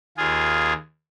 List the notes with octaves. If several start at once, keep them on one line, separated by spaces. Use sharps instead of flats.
D#2 F4 G#4